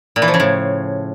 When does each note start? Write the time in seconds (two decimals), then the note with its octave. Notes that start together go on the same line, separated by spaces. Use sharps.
0.16 A#2
0.22 E3
0.28 F3
0.34 C#3
0.40 A2